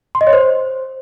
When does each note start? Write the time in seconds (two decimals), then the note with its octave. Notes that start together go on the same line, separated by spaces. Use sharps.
0.15 C6
0.21 D#5
0.27 C#5
0.33 C5